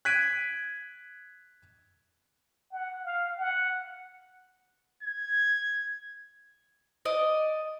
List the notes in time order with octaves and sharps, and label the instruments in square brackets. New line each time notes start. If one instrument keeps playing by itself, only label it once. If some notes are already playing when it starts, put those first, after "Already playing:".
[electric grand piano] F#6 G#6 B6 D7 D#7
[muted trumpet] F#5
F5
F#5
[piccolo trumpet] G#6
[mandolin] D5 D#5 D6